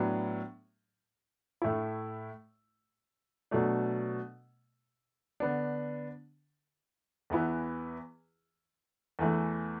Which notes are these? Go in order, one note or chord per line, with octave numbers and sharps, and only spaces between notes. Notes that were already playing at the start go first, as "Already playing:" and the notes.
Already playing: A2 F#3 B3 D4
A2 A3 E4
B2 F#3 A3 D4
D3 B3 D4
E2 E3 B3 E4
E2 E3 A3